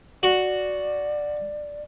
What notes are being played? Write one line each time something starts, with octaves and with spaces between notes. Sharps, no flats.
F#4 D5